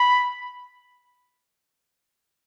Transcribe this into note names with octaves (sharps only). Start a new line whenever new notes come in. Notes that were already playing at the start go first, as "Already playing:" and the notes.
Already playing: B5